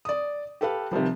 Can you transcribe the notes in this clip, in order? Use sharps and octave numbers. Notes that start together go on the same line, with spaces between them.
D5 D#6
G4 A4 B4 F5
C3 D#3 F3 G3